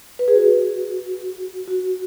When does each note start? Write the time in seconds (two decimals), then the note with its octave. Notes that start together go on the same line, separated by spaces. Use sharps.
0.19 B4
0.28 G#4
0.36 F#4
1.68 F#4